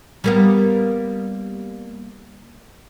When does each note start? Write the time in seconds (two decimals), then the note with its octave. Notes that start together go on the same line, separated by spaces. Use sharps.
0.24 G3 A#3 B3